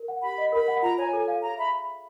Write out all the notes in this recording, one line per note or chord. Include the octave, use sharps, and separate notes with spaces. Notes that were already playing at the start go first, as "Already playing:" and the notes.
Already playing: A#4
F#5
G4 B5
D#5
A#4 B5
F#5
F4 A#5
C#5 G#5
A4
F5
G#4 A#5
E5 B5